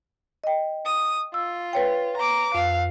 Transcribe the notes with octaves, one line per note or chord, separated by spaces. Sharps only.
D#5 G5
D#6
F4 E6
B4 C#5 G5
A#5 D6
F2 F5